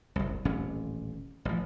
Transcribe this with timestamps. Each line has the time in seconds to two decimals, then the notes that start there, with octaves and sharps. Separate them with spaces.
0.16 F#1 C2
0.45 D#1 A1 C3 C#4
1.45 A1 F3